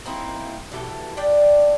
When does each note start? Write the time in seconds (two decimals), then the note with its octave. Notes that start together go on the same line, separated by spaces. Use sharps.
0.06 A#3 C4 D#4 E4
0.72 B2 E3 G4 A4
1.17 D4 G4 D5 G5